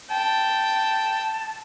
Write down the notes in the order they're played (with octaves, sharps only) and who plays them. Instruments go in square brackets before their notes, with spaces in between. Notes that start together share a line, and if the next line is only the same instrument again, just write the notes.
[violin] G5 [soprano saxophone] A5